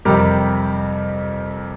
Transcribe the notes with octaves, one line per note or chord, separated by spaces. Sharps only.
F2 C3 G3 G4 A#4